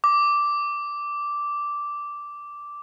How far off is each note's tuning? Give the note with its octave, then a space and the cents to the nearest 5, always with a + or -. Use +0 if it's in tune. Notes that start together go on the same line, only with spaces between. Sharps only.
D6 -5